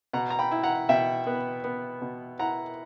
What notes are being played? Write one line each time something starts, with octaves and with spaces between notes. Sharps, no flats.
B2 F#5 A#5
A#5
G5 B5
E4
F#5 A#5
B2 E5 G5
B3
B3
B2
E4 F#5 A#5